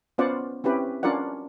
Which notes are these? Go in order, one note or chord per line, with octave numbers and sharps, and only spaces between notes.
B3 C#4 F4 C5 D5 F#5
C4 C#4 E4 G4 B4
C#4 D4 F4 A#4 D5 F#5